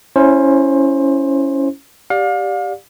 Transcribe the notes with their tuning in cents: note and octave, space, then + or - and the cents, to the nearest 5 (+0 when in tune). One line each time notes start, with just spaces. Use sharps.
C#4 +0 E4 +0 C5 +20
G4 +0 D5 +0 F5 +35